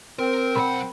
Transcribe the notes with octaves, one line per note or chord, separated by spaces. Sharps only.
C4 A#4
B1 A#4 F#5 B5 C6